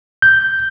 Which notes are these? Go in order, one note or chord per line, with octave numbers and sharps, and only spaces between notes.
G6